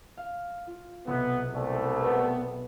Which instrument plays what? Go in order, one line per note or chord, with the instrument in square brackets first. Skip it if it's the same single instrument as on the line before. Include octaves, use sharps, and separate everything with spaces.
[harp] F5
F4
[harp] B1 C3 [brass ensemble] B3
[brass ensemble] C2 A3
[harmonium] B3 [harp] B4